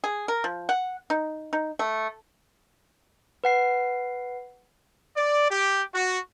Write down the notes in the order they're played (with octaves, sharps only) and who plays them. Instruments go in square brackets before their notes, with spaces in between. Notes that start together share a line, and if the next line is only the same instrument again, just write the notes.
[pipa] G#4
A#4
F3
F#5
D#4
D#4
A3
[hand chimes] B4 F#5 C7
[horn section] D5
G4
F#4